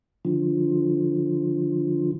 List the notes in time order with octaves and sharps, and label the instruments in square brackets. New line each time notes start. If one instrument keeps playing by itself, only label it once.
[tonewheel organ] D3 F3